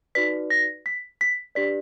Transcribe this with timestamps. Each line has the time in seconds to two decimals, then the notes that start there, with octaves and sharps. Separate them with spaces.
0.15 D#4 F#4 B4 D5 B6
0.50 A#6
0.86 B6
1.21 B6
1.55 D4 G4 B4 D5 B6